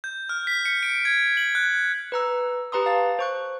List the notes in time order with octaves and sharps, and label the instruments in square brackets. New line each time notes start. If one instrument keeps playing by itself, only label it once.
[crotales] G6
F6
B6
C#7
D7
G#6
F#7
F#6
[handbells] B4 A#5 E6
G4 B4 A#5 C6 D#6
F5 A5 A6
C5 C#6 F#6